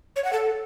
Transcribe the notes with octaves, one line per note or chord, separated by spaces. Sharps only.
C#5
F#5
A4